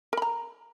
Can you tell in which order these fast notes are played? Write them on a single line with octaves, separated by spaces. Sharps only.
A#4 B5 A#5